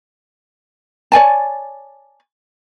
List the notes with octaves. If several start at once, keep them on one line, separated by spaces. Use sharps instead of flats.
C#5 D5 G#5 A5